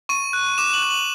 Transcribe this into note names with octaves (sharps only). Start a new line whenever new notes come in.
C#6 D#7
F#6
D6 E7
F#7
F#6
F#7